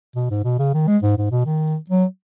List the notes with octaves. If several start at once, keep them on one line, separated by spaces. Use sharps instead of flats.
B2
G#2
B2
C#3
D#3
G#3
G#2
G#2
B2
D#3
F#3